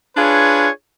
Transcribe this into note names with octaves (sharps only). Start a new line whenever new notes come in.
D4 F4 G#4 B4 C#5